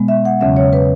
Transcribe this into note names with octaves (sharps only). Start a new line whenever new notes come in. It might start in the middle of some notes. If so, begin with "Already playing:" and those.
Already playing: B2 G#3 B3
E5
F#5
E2 C#3 F#3 C#4 E5
C#5
B4